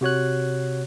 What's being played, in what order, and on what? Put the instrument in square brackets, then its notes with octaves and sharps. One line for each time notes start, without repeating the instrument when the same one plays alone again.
[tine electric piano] C3 F#4 C#5 F#6